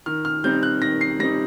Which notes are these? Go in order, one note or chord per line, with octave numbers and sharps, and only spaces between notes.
D#3 F6
F6
G3 C4 D#4 G6
F#6
D#3 A#6
C7
G3 C4 D#4 A#6